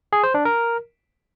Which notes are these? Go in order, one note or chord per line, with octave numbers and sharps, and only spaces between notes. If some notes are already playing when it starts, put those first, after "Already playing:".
G#4
C5
D4
A#4